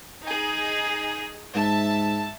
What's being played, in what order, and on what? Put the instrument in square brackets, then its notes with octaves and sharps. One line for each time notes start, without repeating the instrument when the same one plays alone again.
[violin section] D#4 G#4
[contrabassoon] G#2 [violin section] E5 A5